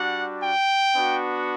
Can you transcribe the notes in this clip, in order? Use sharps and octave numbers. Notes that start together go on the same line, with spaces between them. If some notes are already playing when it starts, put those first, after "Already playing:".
Already playing: G3 D4 F#4 F#5
G5
B3 D4 F#4